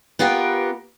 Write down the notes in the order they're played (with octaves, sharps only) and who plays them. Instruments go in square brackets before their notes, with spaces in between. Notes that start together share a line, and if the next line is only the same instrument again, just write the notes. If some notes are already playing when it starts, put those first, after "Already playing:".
[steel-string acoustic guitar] B3 F4 G4 A#4 B4